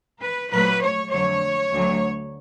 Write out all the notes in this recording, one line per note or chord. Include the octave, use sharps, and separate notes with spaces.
B4
A#2 F#3 A3 B4
C#5
F2 D3 F#3 A3 C#5
D2 D3 F#3